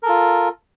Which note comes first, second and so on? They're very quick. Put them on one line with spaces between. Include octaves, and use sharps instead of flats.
A#4 A4 F4